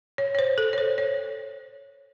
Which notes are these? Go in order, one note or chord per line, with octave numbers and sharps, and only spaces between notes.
C#5
C#5
C5
A4
C#5
C5
C#5